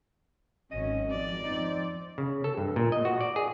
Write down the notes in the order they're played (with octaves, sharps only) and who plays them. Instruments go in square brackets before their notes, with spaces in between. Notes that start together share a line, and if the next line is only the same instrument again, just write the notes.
[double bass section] G#1 F#3 [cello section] C#4 [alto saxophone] D#5
[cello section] F2 [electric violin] D5
[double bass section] C4 [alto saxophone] D#4
[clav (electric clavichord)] C#3
A4
G2
A#2
D#5
F#4
D5
G#4